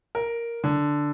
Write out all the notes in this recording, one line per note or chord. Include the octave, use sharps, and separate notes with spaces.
A#4
D3